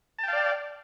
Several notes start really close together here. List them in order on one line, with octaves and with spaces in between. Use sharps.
A5 G5 F5 D5